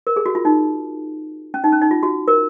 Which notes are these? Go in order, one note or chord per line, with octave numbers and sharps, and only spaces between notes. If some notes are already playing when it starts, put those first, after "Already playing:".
A#4
G#4
F#4
F4
D#4
C#4
D#4
C#4
D#4
F4
F#4
A#4